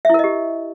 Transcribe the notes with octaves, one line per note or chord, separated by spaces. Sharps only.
E4 G4 A#4 D#5 E5